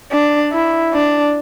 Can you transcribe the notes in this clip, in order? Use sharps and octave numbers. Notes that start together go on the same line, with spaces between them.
D4
E4
D4